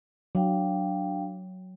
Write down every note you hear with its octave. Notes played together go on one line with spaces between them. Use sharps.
F#3 D4 F5 G5